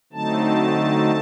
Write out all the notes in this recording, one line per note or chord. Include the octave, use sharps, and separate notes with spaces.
D3 F#3 A3 C4 D#4 A5